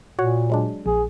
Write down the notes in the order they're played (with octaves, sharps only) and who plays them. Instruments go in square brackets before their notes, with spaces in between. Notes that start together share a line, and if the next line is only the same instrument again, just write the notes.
[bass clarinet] A#2 [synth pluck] F#4 C#5 F#5
[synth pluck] F#3 G#3 D4
[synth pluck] A#1 [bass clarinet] G#4